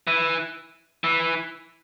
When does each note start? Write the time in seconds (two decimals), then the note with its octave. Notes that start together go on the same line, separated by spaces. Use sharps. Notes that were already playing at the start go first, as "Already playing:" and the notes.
0.07 E3
1.04 E3